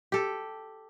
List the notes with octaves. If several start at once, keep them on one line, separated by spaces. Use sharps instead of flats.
G4 A4